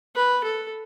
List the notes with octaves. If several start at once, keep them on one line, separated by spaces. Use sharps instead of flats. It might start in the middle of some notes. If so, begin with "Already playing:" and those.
B4
A4